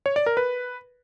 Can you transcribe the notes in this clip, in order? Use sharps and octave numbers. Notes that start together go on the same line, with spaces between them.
C#5
D5
A#4
B4